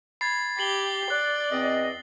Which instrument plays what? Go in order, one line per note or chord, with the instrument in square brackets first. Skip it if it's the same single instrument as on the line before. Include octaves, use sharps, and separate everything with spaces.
[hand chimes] B5 G#6 [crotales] A6 C7
[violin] G4 [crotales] C7 F#7 G7
[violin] D5 [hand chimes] F#6
[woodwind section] E2 C4 D#5